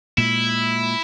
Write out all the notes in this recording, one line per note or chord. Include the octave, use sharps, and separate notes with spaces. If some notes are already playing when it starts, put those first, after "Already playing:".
A#2 G#3 E4